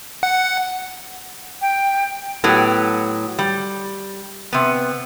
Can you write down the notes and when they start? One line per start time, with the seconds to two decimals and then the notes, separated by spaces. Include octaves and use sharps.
0.23 F#5
1.62 G5
2.44 A2 F#3 B3 G4
3.39 G3
4.53 C3 B3